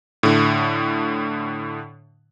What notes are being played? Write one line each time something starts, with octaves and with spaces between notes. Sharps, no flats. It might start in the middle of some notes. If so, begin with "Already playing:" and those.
A2 D3